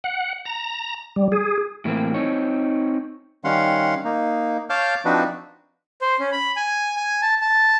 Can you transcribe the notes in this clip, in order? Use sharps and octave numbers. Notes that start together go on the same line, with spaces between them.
F#5
A#5
G3
G#4
A2 E3 A#3 C4
C4 D#4 C#5
D#3 G3 C#4 F5 F#5 C6
A#3 D#4
C#5 F5 A5 D6 F6 G6
F3 C4 D4 D#4 F#4 B4
C5
C#4
B5
G#5
G#5
A5
A5